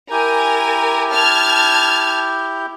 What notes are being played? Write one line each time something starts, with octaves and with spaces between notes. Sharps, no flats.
E4 G4 A#4 G#5 G6
A5 F6 G#6